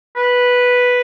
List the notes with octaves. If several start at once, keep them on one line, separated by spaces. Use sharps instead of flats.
B4